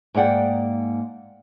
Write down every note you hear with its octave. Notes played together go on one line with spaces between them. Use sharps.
G#2 A#3 D5 F#5 G5